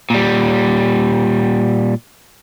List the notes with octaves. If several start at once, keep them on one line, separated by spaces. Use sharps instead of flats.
A#2 G3